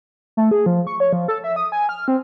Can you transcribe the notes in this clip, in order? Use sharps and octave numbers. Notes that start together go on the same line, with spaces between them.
A3
G#4
F3
C#6
C#5
F3
A4
E5
D#6
G#5
F6
C4